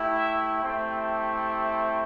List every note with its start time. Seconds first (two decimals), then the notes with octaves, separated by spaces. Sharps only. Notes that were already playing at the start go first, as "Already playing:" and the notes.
Already playing: A3 E4 G4
0.18 E5
0.62 A3 C4 E4 G4 G5